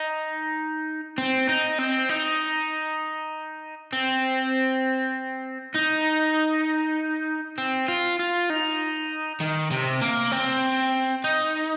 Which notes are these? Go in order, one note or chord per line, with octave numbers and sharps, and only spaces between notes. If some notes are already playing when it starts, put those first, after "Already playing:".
Already playing: D#4
C4
D#4
C4
D#4
C4
D#4
C4
F4
F4
D#4
D#3
C3
A#3
C4
D#4